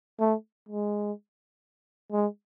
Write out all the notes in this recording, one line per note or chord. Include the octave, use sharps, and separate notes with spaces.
A3
G#3
G#3